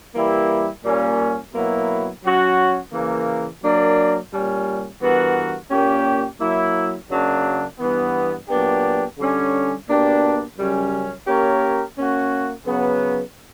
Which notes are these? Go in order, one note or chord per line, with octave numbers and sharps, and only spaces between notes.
E3 G3 A#3 E4 G4
A#2 G3 A#3 C#4
B2 F#3 A#3 E4
F#3 C#4 F#4
C#3 E3 A#3
F#3 A#3 D4 A#4 D5
A#2 G3 C#4
G2 E3 B3 F#4 A#4
A#2 A#3 C#4 G4
F#3 A#3 E4
F#2 C#3 F#3 A#3 D4
G2 E3 B3
A#2 F#3 B3 D4 G4
D3 G3 C#4
B2 A#3 D4 G4
F#2 C#3 G3 C#4
A#3 C#4 G4 A#4 C#5
A#3 C#4 F#4
C#3 F#3 B3